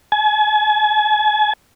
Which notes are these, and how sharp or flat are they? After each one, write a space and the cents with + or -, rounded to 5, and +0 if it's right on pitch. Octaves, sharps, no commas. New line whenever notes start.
G#5 +40